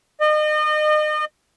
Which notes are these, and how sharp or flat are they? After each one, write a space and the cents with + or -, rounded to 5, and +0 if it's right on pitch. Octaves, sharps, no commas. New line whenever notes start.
D#5 -35